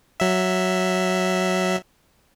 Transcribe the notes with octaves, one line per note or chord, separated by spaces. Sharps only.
F#3 E5